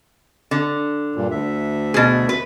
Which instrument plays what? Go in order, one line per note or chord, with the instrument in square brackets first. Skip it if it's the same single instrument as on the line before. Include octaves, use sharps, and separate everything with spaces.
[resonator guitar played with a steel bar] D3
[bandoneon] G2 A#2
D2 E5
[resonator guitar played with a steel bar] B2 G#4
B4